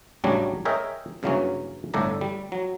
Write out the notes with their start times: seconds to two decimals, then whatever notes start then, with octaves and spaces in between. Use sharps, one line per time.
0.24 A1 C#3 F#3 G3 D4 C#5
0.65 G#4 A#4 C#5 D#5 E5 G5
1.23 G2 C#3 E3 F#3 A#3 C#4
1.94 G1 A2 A4 D5 A#5
2.21 G3
2.52 F#3